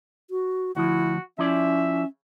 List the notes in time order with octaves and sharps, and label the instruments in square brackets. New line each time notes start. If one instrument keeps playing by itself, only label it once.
[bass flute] F#4
[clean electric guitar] D2 F3 [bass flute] E4 [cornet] F#4
[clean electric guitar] F3 E4 D5 [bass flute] C#4 [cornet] E5